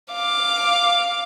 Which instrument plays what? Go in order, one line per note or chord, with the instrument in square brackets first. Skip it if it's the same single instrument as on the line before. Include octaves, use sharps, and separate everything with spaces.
[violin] F5 D6